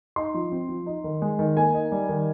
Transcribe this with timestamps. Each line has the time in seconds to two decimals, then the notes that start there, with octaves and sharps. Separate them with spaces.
0.16 D#4 C6
0.34 F3
0.52 C4
0.69 F3
0.86 D#4
1.04 D#3
1.22 G#3
1.39 D#3
1.57 A#3 G#5
1.74 D#4
1.92 G3
2.09 D#3